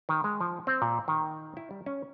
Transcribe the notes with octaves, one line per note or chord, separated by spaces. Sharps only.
D#3
G#3
F3
C4
A#2
D#3
E4
G3
C#4